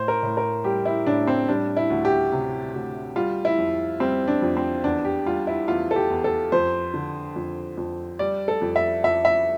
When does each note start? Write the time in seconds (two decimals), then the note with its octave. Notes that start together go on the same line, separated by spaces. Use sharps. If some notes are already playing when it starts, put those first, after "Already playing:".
Already playing: A2 C5
0.08 A#4
0.23 A2
0.37 A#4
0.64 G3 G4
0.85 E4
1.06 A2 D4
1.27 C4
1.48 G3 D4
1.77 E4
1.90 D2
2.05 G4
2.32 C3
2.74 D2
3.16 G3 F4
3.45 E4
3.58 F2
4.00 G3 C4
4.28 D4
4.42 F2
4.57 C4
4.84 E2 D4
5.05 G4
5.26 G3 F4
5.47 E4
5.68 E2 F4
5.91 A4
5.96 G4
6.10 E2
6.24 A4
6.52 F2 C5
6.94 D3
7.36 F2
7.77 F2
8.19 G3 D5
8.48 A4
8.62 F2
8.76 E5
9.04 F2 E5
9.25 E5